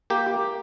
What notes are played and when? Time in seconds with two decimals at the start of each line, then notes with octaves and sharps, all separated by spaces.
0.10 A#3 G4